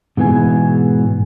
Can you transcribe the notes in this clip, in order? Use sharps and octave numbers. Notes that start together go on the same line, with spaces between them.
G#2 B2 E3 B3 G#4 G#5